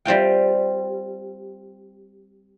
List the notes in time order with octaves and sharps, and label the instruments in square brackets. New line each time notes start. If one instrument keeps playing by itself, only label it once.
[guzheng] G3 C4 F4 G5